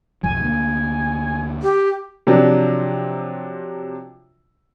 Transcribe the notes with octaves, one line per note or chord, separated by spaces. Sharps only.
B1 F2 F#3 G#5
D2 A#3
G4
C3 F3 F#3 D4